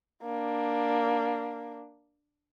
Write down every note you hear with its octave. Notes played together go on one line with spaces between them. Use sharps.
A#3 D4